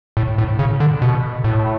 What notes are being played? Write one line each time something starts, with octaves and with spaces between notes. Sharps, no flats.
A2
A2
C#3
D3
B2
A2